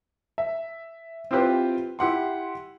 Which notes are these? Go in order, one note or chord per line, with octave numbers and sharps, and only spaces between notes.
E5
C4 E4 F4 G4 B4 C5
E4 G4 F#5 C6